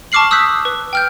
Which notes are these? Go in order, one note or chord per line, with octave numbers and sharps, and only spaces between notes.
A5 C#6 D6 F6 C7 F#7
D#6 E6 F#6 G6 B6
B4
G5 F6 G6